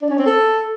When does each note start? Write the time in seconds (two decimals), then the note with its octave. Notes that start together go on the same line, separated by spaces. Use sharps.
0.02 D4
0.10 C#4
0.18 C4
0.26 A4